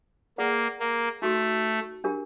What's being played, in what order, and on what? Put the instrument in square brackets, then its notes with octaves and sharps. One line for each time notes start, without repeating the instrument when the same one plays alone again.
[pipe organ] A#3 [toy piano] G#4 B4 D5 F#5
[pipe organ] A#3
[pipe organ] A3 [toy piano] D#4 F#4 A4
[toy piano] D4 G4 A#4